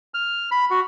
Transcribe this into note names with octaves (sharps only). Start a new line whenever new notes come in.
F6
B5
F#4